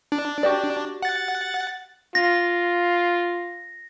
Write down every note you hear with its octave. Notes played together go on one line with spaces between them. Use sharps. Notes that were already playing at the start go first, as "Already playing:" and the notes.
D4
F#4 G4 D5
F#5 A6
F4 A#6